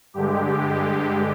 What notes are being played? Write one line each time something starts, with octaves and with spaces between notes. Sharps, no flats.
G2 D3 G#3 G4